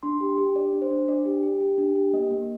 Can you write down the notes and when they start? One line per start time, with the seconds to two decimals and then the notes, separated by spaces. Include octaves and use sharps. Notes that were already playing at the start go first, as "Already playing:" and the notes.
0.03 D4 C6
0.21 G4
0.38 G4
0.55 D4 D5
0.73 D4
0.82 C5
0.91 D4
1.08 D4 D5
1.25 G4
1.43 G4
1.61 G4
1.78 D4
1.96 G4
2.13 A#3 D#5
2.31 A#3